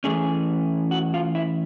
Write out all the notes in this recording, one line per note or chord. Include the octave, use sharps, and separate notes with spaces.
E3 A3 C#4 G#4
F#4
F4
E4